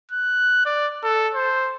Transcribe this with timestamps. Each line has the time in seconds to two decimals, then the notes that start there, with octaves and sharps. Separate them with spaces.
0.11 F#6
0.65 D5
1.03 A4
1.34 C5